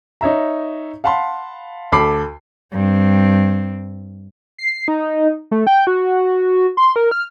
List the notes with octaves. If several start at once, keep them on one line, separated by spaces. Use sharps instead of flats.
D#4 C#5 E5 A#5
F5 F#5 A5 B5 C6
D2 A4 B5 D6 C7
G2 C4
C7
D#4
A3
G5
F#4
C6
A#4
F6